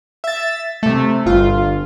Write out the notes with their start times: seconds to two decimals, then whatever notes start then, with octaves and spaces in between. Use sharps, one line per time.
0.24 E5 A6
0.83 C3 A3
1.25 G1 F4